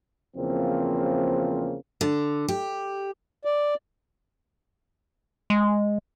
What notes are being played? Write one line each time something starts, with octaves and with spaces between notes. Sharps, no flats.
E2 C#3 F3 A#3 C4
D3
G4
D5
G#3